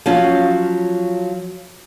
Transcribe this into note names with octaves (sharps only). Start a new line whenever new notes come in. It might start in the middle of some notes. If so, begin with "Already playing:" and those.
F3 F#3 C#4 F4